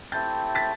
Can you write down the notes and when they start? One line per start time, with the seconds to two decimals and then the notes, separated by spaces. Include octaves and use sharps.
0.12 A3 C4 E4 G4 G6 A6
0.55 A6 B6